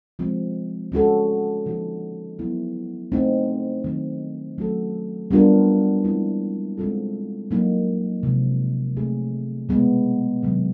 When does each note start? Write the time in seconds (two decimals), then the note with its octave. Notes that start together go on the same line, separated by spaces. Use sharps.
0.19 F3 G#3 C4
0.92 G#3 C#4 F#4 A4
1.66 D3 F3 A#3 D#4 F#4
2.39 F#3 B3 E4
3.12 A3 C4 D#4
3.84 D#3 F#3 A3 C4
4.58 F#3 A3 C#4 F#4 A4
5.31 G3 B3 D4 F4 A#4
6.04 F3 G#3 C4 E4
6.77 G#3 C4 F4 A4
7.51 F#3 A#3 D#4
8.23 C3 F3 G#3 C4
8.97 A3 C4 D#4 G#4
9.69 B2 G#3 B3
10.43 C3 D#3 F#3